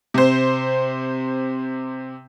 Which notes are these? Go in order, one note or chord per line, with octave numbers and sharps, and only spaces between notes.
C3 C5